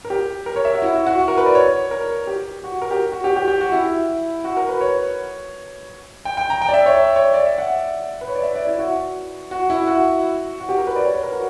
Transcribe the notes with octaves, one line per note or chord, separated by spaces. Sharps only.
A#4
G4
A#4
C#5
E5
F#4
E4
F#4
F#4
F#4
A#4
B4
D5
C#5
A#4
G4
F#4
A#4
G4
F#4
G4
G4
G4
F#4
E4
F#4
A#4
B4
C#5
G5
G5
A#5
G5
D5
E5
C#5
C#5
D5
E5
F#5
B4
C#5
D5
E5
D5
E4
F#4
F#4
E4
F#4
F#4
G4
A#4
B4
D5
C#5
B4
A#4
F#4